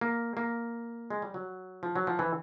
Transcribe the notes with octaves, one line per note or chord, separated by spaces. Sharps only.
A#3
A#3
G#3
G3
F#3
F3
F#3
F3
E3